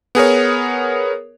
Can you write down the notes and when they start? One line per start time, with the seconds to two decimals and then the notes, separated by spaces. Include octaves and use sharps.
0.15 B3 G#4 A#4 C#5